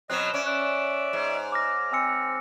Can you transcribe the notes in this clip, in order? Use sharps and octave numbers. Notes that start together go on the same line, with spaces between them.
B2 F#3 C4 D#5 F#6 E7
C#4 D5 E5 D6
D5 E5 F#6
G#2
D6 F6 A#6
C4 G#5 E6 C#7